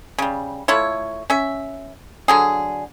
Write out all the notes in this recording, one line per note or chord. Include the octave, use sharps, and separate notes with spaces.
C#3 G3
A3 E4 F4 C#5
C#4 E5
D3 F#3 G#4